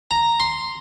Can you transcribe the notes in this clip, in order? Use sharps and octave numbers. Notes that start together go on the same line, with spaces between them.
A#5
C6